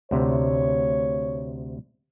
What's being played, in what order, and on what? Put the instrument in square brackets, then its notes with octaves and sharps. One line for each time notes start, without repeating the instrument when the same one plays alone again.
[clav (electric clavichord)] D2 C3 [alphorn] C#5